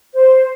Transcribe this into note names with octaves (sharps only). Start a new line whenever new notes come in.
C5